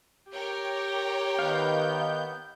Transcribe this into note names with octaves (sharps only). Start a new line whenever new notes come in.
G4 A#4 C#5 G5
D#3 B3 F5 G6